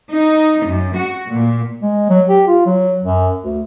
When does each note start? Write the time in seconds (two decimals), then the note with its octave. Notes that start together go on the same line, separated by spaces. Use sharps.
0.10 D#4
0.66 F#2
0.96 F#4
1.29 A#2
1.82 G#3
2.09 F#3
2.29 G4
2.47 F4
2.66 F#3
3.03 F#2
3.42 D2